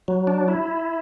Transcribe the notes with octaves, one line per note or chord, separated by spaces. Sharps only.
F#3
D4
E4